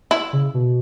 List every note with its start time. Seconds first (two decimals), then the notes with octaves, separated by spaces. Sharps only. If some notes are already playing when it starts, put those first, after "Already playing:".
0.11 E4
0.33 C#3
0.54 B2